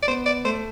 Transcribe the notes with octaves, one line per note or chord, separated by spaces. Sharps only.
D5
B3 C5
D5
A3 C5